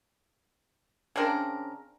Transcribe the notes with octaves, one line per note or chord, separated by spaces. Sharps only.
C#3 C4 D4 A#4